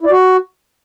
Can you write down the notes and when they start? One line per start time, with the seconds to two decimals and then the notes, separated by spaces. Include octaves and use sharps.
0.01 E4
0.06 D5
0.11 F#4